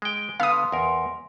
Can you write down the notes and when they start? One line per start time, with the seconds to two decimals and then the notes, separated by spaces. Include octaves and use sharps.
0.02 G#3 G5
0.40 D3 B3 F5 D#6
0.51 C6
0.72 E2 A#4